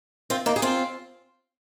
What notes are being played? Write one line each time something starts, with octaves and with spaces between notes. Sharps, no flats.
C4 F4
A#3 D#4
G#4
C4 F4